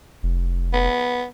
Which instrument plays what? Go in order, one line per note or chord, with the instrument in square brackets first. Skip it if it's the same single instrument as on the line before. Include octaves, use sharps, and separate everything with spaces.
[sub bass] F1
[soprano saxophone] B3